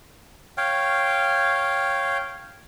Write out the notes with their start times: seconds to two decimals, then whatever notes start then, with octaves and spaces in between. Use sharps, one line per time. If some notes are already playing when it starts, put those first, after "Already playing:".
0.57 C#5 F5 G5